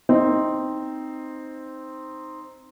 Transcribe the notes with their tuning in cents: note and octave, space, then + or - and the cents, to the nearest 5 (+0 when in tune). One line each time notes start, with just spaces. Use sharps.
C4 +0 D#4 +0